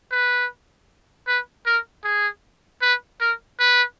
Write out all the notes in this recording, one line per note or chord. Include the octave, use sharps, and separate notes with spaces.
B4
B4
A#4
G#4
B4
A#4
B4